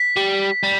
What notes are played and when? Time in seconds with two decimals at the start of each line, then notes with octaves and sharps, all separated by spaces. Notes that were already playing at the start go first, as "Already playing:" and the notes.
Already playing: B6
0.16 G3
0.63 G3